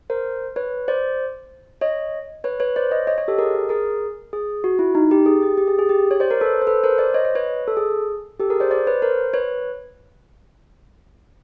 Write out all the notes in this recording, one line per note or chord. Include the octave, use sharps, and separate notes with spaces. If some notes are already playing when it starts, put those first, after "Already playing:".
A#4 C5
B4 C#5
C5 D5
C#5 D#5
B4 C#5
B4 C#5
C5 D5
C#5 D#5
C#5 D#5
C#5 D#5
G4 A4
G#4 A#4
G#4 A#4
G#4
F#4
E4
D#4
G4
G#4
G4
G4
G#4
G#4
G4
C#5
C5 D5
A#4 C5
A4 B4
C5
A4 B4
A#4 C5
C5 D5
C#5 D#5
C#5 D#5
B4 C#5
A4
G#4
G4 A4
G#4 A#4
C5 D5
C5 D5
B4 C#5
A#4 C5
B4 C#5